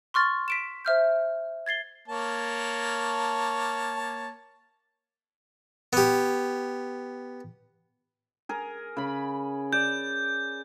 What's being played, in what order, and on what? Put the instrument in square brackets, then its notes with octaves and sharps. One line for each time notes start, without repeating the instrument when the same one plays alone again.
[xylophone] C6 C#6 F6 A6
B6 D7 E7
C5 E5 F6 G6
G#6 A6 C7 G7
[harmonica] A#3 C#5 A5
[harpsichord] B3 G4
[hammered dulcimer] G#4 A#4
C#3 B5
[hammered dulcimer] D5 [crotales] G6